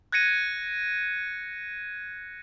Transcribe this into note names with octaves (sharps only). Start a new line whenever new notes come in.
F#6 G#6 A#6 C#7 D#7